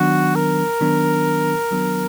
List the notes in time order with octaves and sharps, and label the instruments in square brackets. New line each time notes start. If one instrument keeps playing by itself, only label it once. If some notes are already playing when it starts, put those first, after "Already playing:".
Already playing: [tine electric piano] D#3 F#3 B3 D4 [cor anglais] F#4
[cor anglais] A#4
[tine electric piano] D#3 F#3 B3 D4
D#3 F#3 B3 D4